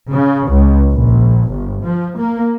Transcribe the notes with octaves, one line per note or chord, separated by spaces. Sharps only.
C#3
C#2
A#1
G1
F3
A#3